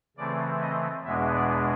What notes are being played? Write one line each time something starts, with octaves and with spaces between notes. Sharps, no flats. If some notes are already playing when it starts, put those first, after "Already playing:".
C#3 E3 A3 C4 D5
D#5
E2 B2 G#3 B3 D4 E5
D5